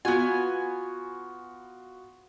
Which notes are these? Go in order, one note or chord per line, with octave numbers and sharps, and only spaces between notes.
B3 F4 F#4 G#5